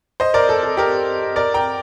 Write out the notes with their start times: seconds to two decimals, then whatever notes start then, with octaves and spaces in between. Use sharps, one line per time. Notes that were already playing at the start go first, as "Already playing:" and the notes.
0.20 C5 D#5
0.34 A#4 D5
0.49 A4
0.63 A4
0.77 G4 A#4
1.36 A#4 D5
1.54 G5 A#5